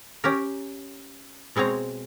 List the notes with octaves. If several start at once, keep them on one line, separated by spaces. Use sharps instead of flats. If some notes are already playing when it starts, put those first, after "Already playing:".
C#4 G4 A#4
B2 G#3 C4 C#5 A#5